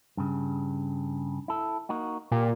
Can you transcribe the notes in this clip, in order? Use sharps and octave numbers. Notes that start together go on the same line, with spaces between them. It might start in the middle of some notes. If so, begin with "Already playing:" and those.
G2 C#3
E4 A4
A#3 D#4 F#4
A#2 G4